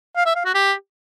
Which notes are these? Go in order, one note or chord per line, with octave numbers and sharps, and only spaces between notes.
F5
E5
F5
F#4
G4